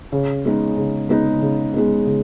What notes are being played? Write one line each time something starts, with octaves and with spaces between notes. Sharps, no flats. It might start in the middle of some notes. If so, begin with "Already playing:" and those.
C#3
G#3 B3 D#4
C#3
G#3 B3 D#4
C#3
G#3 B3 D#4
C#3